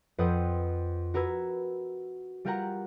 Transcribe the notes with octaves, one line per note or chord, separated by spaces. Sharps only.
F2 B4 C5 F#5 G5 D#6
F#4 A#4 B4 E6 G#6
G3 F4 G4 A#4 F#5 A#5